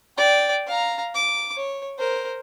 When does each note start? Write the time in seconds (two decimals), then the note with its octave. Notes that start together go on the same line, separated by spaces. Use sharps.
0.17 D5 G5
0.67 F5 A#5
1.14 D6
1.56 C#5
1.98 A#4 C5